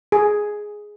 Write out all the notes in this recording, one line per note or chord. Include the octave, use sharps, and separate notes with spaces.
G#4